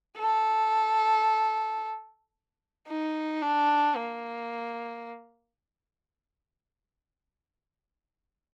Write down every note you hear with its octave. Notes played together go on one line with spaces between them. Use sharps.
A4
D#4
D4
A#3